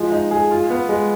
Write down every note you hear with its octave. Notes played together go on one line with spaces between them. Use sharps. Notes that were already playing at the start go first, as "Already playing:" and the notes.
Already playing: F3 G#3
D#4
G#4
F4
B3
G#3